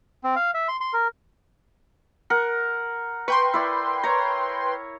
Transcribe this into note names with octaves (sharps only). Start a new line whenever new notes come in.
C4
F5
E5
C6
C6
A#4
A#4 F#5
B4 G5 C6 C#6
E4 D5
C#5 A#5